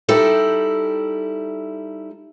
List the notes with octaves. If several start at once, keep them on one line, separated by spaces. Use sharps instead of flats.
G3 D#4 E4 A4 G5